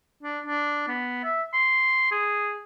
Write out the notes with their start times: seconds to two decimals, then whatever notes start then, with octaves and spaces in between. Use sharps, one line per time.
0.23 D4
0.46 D4
0.88 B3
1.24 E5
1.54 C6
2.12 G#4